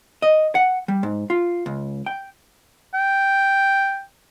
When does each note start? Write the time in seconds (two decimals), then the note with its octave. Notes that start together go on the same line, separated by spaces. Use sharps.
0.22 D#5
0.55 F#5
0.88 G3
1.03 G#2
1.30 F4
1.66 C#2
2.06 G5
2.94 G5